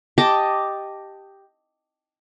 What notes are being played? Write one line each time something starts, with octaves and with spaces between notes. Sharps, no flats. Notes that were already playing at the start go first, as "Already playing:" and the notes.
G4 D#5 A5 D6